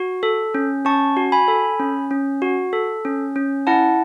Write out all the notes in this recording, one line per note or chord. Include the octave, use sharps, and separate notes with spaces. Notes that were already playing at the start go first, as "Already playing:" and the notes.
Already playing: F#4
A4
C#4
C#4 A5 C#6
F#4
G#5 B5
A4
C#4
C#4
F#4
A4
C#4
C#4
E4 F#5 A5